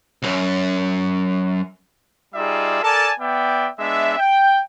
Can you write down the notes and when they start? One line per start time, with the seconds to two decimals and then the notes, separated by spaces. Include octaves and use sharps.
0.23 C2 F#2
2.35 G3 D#4 F4 G#4 D5 E5
2.83 A4 A#4 D5 G#5 A5
3.20 B3 D5 E5 G5
3.79 G#3 B3 D4 E5
4.18 G5